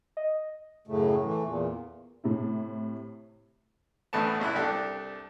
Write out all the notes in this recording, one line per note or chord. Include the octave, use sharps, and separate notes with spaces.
D#5
F#2 A2 C#3 A3
E3 A3
E2 A#2
A2 C3 E4
D2 A2 E3 A3 B3 A5
G#1 C#2 E4 F#6
C2 D4 G4 A4